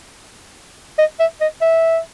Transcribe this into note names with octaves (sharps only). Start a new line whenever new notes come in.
D#5
E5
D#5
E5